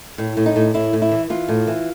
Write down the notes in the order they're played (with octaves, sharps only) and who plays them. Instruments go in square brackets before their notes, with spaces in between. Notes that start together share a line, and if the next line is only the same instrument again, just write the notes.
[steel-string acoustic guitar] A2
A2
D#4
A2
A2 E4
A2
E4
E3
E3 F4
A2
E3